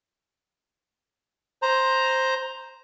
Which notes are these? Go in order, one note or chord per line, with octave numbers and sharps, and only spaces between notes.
C5 A#5